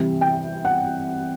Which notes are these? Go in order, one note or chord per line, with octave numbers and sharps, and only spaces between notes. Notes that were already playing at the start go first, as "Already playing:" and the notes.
Already playing: C3 E3 G3
G5
F#5